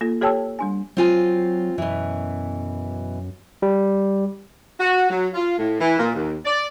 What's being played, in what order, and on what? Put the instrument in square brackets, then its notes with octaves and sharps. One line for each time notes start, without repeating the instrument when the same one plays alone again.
[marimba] A#3 F4 A4
G4 A4 C#5 G5 A5 E6
G3 D4 G#5
[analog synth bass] F#3 [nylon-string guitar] C4 F4 G#5
[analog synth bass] F#2 [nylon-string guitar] B2 E3
[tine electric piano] G3
[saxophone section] F#4
F#3
F4
A2
E3
A#2
D#2
D5